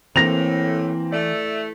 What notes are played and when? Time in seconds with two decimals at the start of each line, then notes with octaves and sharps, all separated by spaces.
0.16 A2 E3 A#3 C4 A#6 F7
1.12 A3 D5 E5